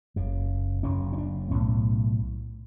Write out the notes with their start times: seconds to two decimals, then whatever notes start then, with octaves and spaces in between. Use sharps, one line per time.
0.16 F#1 F#2 C#3
0.83 F#1 F#2 C#3 C#4
1.13 C#4
1.18 D4
1.51 B1 C#4
1.54 A2